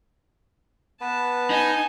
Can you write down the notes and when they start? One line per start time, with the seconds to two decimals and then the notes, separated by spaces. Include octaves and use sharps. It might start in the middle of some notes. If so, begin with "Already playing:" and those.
1.01 B3 B4 A5
1.50 D#4 G#5